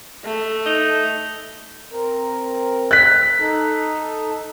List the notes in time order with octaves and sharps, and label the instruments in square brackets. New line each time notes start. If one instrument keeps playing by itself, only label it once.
[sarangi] A3
[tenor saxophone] D#4
[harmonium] C4 A#4
[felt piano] F#6 B6
[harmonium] D#4 A4